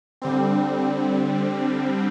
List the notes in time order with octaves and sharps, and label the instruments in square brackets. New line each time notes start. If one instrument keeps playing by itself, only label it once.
[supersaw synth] D3 G3 C4